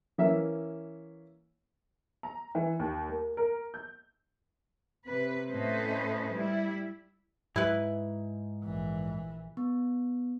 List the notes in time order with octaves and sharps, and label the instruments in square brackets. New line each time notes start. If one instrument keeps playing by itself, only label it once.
[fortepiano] E3 A#3 C#4 E5
[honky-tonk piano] A#5
E3
D#2
A#3
A#4
G6
[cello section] C3 B4
A2 A3 C#4 B4 C5 D#5
G3 E4
[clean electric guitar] G#2 [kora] E4 B4
[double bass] A#1 E3
[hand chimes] B3